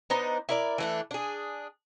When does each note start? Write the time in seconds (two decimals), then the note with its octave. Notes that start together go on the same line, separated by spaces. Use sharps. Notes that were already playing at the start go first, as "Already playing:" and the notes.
0.10 B3 D4 D#4 C5
0.49 E4 A#4 D5
0.78 E3 A3 D4
1.11 D4 G#4